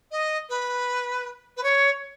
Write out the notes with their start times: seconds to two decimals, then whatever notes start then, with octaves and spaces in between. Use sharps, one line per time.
0.12 D#5
0.49 B4
1.57 B4
1.63 C#5